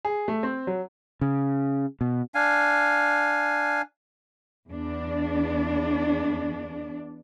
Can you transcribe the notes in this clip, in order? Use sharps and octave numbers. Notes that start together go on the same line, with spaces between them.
G#4
A3
C4
F#3
C#3
B2
D4 F5 G#5
E2 D4